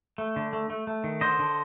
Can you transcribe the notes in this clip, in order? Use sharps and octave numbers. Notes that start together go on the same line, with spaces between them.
A3
D3
A3
A3
A3
D#3
D3 C5 D#5
D3